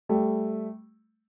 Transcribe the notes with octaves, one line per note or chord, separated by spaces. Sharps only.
G3 A3